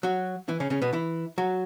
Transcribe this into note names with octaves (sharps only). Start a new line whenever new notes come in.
F#3 F#4
E3 E4
C#3 C#4
C#3 C#4
B2 B3
E3 E4
F#3 F#4